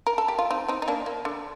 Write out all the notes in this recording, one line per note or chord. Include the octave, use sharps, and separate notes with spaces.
A#4
A4
G4
F4
C4 D#4
C4 D#4
D#4
A#3 D4
A#3
D3